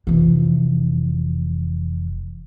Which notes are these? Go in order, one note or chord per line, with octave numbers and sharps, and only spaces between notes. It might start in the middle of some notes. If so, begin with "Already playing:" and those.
F1 E3